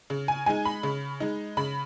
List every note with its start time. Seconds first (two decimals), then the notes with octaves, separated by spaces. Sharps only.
0.10 C#3
0.28 G#5
0.46 G#3 D#4 G#5
0.65 B5
0.83 C#3
1.20 G#3 D#4
1.57 C#3 B5